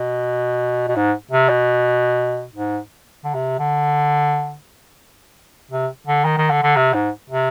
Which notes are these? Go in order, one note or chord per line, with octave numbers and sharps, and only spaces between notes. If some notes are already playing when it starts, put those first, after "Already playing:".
Already playing: B2
B2
G#2
C3
B2
G#2
D3
C3
D3
C3
D3
D#3
D#3
D3
D3
C3
G#2
C3